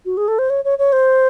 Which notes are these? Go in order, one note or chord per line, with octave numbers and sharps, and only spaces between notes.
F#4
G#4
A4
C5
C#5
C#5
C#5
C5